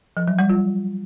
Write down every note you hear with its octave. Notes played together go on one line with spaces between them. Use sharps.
F3
F#3
G3
F4